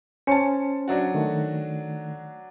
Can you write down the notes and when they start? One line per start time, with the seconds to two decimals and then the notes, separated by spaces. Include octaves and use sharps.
0.27 C#4 C5 G#5 A5 C#7
0.88 F#3 D4 F#4
1.14 D#3 A3